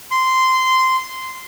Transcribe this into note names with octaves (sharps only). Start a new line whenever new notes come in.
C6